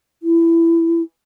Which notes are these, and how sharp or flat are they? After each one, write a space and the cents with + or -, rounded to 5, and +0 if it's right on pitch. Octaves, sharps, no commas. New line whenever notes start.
E4 +15